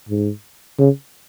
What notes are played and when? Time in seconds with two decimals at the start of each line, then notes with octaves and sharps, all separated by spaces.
0.09 G#2
0.78 C#3